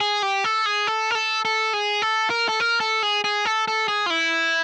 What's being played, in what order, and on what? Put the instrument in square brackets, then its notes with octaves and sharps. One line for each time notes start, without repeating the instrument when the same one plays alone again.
[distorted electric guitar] G#4
G4
A4
G#4
A4
A#4
A4
A4
G#4
A4
A#4
A4
A#4
A4
G#4
G#4
A4
A4
G#4
F4
E4